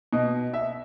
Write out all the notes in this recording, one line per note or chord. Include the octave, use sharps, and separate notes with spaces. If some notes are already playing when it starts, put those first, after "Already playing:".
B2 D#5
E5